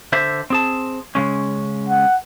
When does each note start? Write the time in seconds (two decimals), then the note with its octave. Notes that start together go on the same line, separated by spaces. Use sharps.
0.13 D3 C5 E5
0.50 C4 G#4 A5
1.15 C#3 G#3 C#4
1.89 F#5